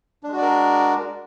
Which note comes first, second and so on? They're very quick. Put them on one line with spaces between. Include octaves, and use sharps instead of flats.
D4 G#3 F#4 D5 A#4